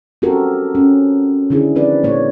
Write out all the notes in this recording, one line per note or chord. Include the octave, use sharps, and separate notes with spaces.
C4 C#4 F#4 G4 A4 A#4
C#4
D3 D#3 D4 E4 G#4
F3 C4 B4 D5
A#2 A#3 C#5